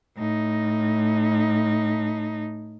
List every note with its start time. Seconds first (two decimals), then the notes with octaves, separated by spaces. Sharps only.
0.17 A2 D#4